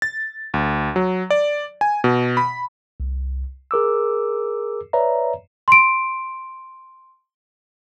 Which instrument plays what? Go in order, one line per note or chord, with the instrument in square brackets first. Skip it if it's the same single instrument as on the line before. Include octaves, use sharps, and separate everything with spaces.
[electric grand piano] A6
D2
F#3
D5
G#5
B2
B5
[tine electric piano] C2
G#4 A#4 D6 E6
B4 C#5 D5 E5 A#5
[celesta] C6 D7